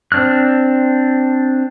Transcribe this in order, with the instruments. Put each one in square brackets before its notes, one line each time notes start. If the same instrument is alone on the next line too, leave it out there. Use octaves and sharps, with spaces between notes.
[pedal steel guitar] C4 D4 F6 F#6